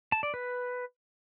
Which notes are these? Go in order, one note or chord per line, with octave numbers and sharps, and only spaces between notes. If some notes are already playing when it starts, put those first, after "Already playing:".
A5
D5
B4